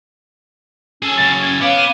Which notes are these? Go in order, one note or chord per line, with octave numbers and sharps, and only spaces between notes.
C#4 G#4 A4
F#2 C#3 A6
G#6
B3 C#5 F5 D6
D#7